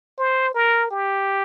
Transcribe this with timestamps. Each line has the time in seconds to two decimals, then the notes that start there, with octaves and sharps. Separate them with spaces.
0.18 C5
0.54 A#4
0.91 G4